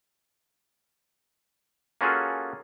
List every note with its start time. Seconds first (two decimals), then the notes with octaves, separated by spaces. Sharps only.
2.01 A#3 C#4 F4 F#4 G#4 A4